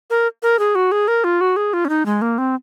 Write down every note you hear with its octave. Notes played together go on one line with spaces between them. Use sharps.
A#4
A#4
G#4
F#4
G#4
A#4
F4
F#4
G#4
F4
C#4
D#4
G#3
A#3
C4